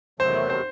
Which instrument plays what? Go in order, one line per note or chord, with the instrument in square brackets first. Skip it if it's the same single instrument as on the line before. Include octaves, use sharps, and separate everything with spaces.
[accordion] E2 C3 D#3 F#3 A3 [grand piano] C5
[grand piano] C5